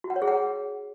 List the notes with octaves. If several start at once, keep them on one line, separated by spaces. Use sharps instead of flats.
F#4
F#5
C#5
G#4
F#5